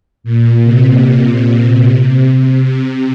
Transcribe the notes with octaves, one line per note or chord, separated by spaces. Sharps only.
A#2
C3
C3